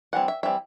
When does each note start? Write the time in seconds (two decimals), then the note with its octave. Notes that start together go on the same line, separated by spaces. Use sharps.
0.13 E3 G3 C4 F#5
0.28 E5
0.43 E3 G3 C4 E5